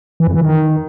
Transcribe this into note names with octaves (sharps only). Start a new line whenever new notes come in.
E3
F2
E3
D#3